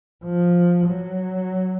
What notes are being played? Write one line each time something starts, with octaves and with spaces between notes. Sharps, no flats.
F3
F#3